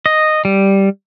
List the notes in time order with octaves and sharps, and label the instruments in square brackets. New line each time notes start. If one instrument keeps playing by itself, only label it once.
[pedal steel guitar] D#5
G3